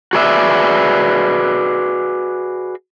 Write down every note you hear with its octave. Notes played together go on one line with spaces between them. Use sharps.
F#4 G#4 B4 D5 E5